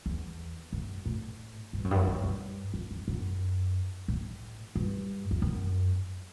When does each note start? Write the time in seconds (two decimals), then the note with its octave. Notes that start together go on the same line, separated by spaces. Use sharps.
0.06 E2
0.73 F#2
1.06 A2
1.73 G2
1.84 F#2
1.91 G2
1.95 F#2
2.07 E2
2.24 G2
2.74 F#2
2.91 F#2
3.08 F#2
4.08 A2
4.75 G2
5.31 E2
5.42 F#2